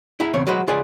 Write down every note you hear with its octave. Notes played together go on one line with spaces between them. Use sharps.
E4 G#4 E5 A#5
E2 C#3 C4 C#5
F#3 G#3 F#4 B4 C5
C#2 F4 G#4 B4 D5 G#5